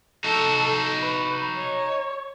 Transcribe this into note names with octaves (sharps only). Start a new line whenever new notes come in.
D#4 F#4 A4
B4
C#5